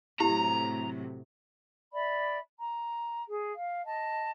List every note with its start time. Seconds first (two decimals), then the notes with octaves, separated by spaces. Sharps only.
0.20 A2 C3 F#3 E4 G4 A#5
1.93 D5 E5 B5
2.58 A#5
3.29 G#4
3.53 F5
3.84 D#5 A5